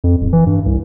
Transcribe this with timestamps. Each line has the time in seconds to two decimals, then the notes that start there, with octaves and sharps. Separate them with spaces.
0.04 F2
0.21 D1
0.33 E3
0.47 G2
0.66 C2